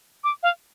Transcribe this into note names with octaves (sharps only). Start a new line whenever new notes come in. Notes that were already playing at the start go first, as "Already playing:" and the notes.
D6
F5